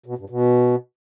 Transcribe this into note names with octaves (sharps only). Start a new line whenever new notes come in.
B2
G2
B2